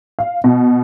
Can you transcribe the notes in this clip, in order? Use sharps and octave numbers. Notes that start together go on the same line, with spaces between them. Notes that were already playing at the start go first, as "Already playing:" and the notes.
F5
B2